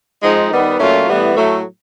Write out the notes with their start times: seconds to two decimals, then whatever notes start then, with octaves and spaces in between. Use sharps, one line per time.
0.23 G#2 F3 G#3 C4 D#4
0.51 D#3 G3 B3 D#4
0.79 A#2 F#3 A3 C#4 F4
1.08 A2 E3 G3 B3
1.36 A2 F#3 A3